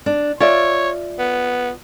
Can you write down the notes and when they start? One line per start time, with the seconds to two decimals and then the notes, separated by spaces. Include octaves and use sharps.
0.06 D4
0.40 F4 C#5 D5 E5
1.19 B3